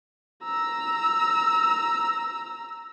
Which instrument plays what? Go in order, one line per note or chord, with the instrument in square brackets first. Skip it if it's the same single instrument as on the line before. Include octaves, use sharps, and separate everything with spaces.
[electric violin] A#5 E6